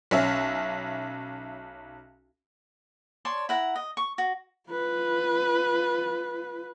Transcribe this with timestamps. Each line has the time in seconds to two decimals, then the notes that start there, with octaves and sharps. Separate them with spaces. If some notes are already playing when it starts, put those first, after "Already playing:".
0.11 B1 C#4 E5
3.25 C#5 D5 A5 C6
3.49 E4 F#5 A#5
3.76 D#5
3.97 C#6
4.18 F#4
4.70 F4 B4